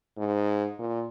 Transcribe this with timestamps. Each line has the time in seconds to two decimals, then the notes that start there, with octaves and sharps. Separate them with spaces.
0.17 G#2
0.79 A#2